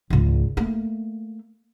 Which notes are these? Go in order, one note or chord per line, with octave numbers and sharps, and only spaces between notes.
G#1 C#2
A3 A#3